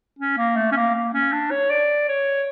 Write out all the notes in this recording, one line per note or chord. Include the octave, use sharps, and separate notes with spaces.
C#4
A#3
A3
C#4
A#3
A#3
C#4
D4
C#5
D5
C#5